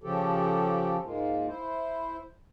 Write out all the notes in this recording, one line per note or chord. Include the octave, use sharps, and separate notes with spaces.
C#3 F3 G4 A4
G#2 G#3 A#3 F4
E4 C5